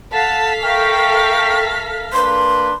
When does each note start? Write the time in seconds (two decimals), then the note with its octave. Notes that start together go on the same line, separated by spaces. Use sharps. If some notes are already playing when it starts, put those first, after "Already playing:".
0.11 A4 F5 F#5 A5 B6
0.62 A#4 E5 G5 C#6 F6
2.13 A#3 D4 B4 C6